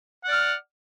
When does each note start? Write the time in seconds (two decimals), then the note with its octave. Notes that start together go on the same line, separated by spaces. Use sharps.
0.24 F#5
0.28 D5
0.32 F6